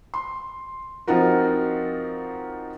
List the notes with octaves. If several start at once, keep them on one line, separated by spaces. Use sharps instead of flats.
C6
F3 C4 D#4 F4 F#4 A#4